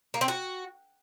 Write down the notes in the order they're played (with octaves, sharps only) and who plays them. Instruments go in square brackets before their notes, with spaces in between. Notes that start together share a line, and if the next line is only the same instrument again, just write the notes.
[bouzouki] A#3
C4
F#4